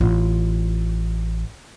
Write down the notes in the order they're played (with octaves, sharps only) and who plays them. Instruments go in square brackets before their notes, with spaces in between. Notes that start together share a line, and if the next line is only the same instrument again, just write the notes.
[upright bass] A1 F4